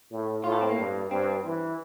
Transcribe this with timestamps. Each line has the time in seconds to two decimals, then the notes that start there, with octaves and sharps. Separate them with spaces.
0.11 A2
0.44 A2 F4
0.52 A4
0.61 C4
0.69 A#3
0.78 G2
1.11 G2 C4
1.44 E3